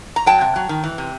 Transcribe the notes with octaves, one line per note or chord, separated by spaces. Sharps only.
A#5
F#3 G5 A5
C3
F#3
D#3
E3
C3